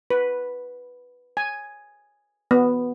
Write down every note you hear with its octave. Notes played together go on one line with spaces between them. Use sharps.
B4
G#5
B3